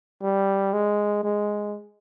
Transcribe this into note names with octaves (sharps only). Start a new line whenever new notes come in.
G3
G#3
G#3